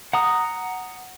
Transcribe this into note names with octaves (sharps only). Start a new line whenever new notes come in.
F#5 A#5 D#6